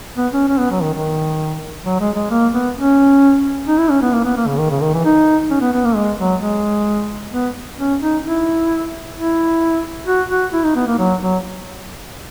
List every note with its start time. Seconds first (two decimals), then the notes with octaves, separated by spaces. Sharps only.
0.17 B3
0.33 C#4
0.48 C#4
0.59 B3
0.71 F#3
0.82 D#3
0.93 D#3
1.85 F#3
2.00 G#3
2.16 G#3
2.30 A#3
2.54 B3
2.76 C#4
3.68 D#4
3.79 E4
3.90 C#4
4.02 B3
4.13 A#3
4.24 B3
4.37 A#3
4.47 C#3
4.58 D#3
4.71 C#3
4.81 D#3
4.93 E3
5.05 D#4
5.50 C#4
5.61 B3
5.73 B3
5.84 A#3
5.95 G#3
6.19 F#3
6.41 G#3
7.32 B3
7.79 C#4
8.01 D#4
8.25 E4
9.16 E4
10.06 F#4
10.30 F#4
10.53 E4
10.64 D#4
10.76 B3
10.87 A#3
10.98 F#3
11.21 F#3